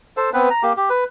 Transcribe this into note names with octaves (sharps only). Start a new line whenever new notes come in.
A4 C5
B3 C4 B4
A#5
A#3 G4
G4
B4